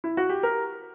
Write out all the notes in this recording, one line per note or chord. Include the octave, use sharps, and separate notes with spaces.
E4
F#4
G4
A#4